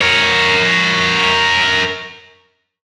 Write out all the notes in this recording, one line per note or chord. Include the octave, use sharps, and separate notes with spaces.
A#4 C#5